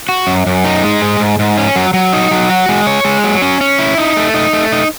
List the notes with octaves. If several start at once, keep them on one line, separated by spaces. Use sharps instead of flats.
F#4
F#2
F#2
D#4
G#3
G#2
G#2
G#2
C#4
F#3
F#3
D#4
F#3
F#4
G#3
C#5
G#3
F#3
C#4
C#4
E4
D#4
A3
D#4
A3
D#4